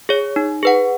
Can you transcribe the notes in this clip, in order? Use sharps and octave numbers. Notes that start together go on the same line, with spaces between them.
G#4 C#5
D#4
G#4 B4 F#5